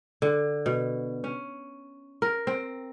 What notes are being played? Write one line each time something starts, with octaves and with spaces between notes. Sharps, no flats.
D3
B2
C#4
A#4
C4